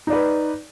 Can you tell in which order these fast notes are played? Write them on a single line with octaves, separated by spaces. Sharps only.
D#4 D5 B4